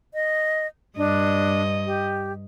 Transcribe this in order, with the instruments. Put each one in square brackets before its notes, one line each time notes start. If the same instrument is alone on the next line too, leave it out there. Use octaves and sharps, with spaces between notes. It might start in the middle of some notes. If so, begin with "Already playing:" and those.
[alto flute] D#5
[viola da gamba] G2 D#5 [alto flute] D4
[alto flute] G4